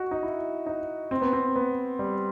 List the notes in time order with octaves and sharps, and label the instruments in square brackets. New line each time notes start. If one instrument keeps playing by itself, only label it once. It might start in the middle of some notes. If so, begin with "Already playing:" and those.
Already playing: [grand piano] F#4 D#5
D#4
E4
D#4
C4
B3
C4
B3
G3